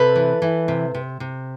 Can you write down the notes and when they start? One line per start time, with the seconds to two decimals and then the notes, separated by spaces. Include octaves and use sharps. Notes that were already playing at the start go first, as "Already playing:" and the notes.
Already playing: C3 A4 B4
0.15 E3
0.42 E3
0.68 C3
0.94 C3
1.20 C3